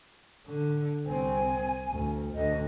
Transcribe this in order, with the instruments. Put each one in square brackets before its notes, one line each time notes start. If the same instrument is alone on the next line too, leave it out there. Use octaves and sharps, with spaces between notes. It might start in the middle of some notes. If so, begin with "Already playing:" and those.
[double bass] D3
[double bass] C2 C4 [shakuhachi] G#5
[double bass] D2
[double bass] D2 D3 [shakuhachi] D#5